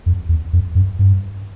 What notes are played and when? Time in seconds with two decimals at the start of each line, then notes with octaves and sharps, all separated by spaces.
0.06 F2
0.29 E2
0.53 F2
0.75 F#2
0.99 G2